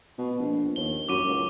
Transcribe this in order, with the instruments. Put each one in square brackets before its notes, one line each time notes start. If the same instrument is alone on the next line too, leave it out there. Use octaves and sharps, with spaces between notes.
[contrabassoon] B2
A#1
[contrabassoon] D#2 [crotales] G7
[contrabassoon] F#2 [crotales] D6 D#7
[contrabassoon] C#2